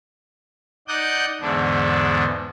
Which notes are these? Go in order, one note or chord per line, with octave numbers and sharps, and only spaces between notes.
D#4 D5 F#5 D#6 F#6 G6
E2 G#2 D3 B3 D4